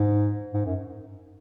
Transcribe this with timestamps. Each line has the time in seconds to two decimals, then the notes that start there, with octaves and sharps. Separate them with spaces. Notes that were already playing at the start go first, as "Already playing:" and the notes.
Already playing: G#2
0.54 G#2
0.65 F#2